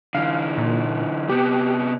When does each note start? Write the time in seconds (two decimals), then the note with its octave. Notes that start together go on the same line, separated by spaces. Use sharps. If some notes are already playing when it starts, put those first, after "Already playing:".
0.15 D3 E3 F5
0.58 A#2
1.29 C3 B3 G4